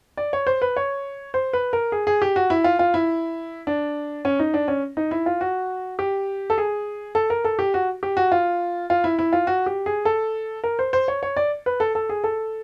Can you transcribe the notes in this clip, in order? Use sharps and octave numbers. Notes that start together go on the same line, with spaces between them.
D5
C#5
C5
B4
C#5
C5
B4
A#4
G#4
G#4
G4
F#4
E4
F4
F4
E4
D4
C#4
D#4
D4
C#4
D#4
E4
F4
F#4
G4
A4
G#4
A4
A#4
A4
G4
F#4
G4
F#4
F4
F4
E4
E4
F4
F#4
G4
G#4
A4
A#4
C5
C5
C#5
C#5
D5
B4
A4
A4
G#4
A4